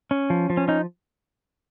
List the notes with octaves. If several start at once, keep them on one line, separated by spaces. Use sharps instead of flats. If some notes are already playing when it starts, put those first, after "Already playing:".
C#4
F3
F3
C#4
C#4 D#4